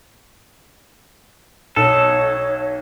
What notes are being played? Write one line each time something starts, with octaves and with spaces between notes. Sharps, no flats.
B1 D#4 A4 C#5